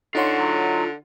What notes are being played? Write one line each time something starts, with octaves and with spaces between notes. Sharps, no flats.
D3 D#4 F4 C#5 F#5 C6
F#3